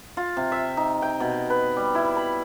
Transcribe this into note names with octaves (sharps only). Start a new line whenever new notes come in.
F4
C3
E5
D#4
G5
B2
B4
G3
E4
B5